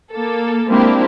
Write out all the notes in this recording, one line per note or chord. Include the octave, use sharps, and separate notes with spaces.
A#3 A4
G#3 A#3 C4 D4 E4 G4